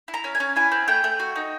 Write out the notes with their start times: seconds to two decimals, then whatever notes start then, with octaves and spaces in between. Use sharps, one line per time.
0.08 E4
0.14 A#5
0.24 C#4
0.35 G#5
0.40 C#4
0.56 E4 G#5
0.72 C4
0.88 A3 G5
1.04 A3
1.20 F#4
1.36 D#4